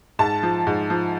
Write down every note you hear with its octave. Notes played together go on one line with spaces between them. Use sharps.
G#2 A5
F3
G#2
F3